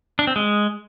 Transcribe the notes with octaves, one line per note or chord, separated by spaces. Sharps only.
D4
C4
G#3